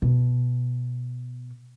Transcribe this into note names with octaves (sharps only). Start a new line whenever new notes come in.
B2